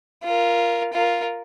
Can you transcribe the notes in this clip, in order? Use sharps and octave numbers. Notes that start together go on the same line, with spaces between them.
F4 A#4
F4 A#4